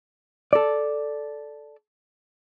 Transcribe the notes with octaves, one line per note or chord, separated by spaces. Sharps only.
A4 D5